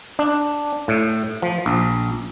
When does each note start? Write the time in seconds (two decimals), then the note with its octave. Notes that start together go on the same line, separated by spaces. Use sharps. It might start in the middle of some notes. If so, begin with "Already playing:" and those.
0.19 D4
0.88 A2
1.42 F3
1.66 A#1